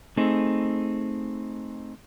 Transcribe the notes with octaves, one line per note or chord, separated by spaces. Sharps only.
A3 C4 D#4 G#4